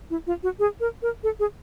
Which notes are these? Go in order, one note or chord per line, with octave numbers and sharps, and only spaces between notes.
E4
F4
F#4
G#4
A#4
A#4
A4
G#4